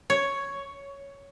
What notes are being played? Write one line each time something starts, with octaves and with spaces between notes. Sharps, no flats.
C#5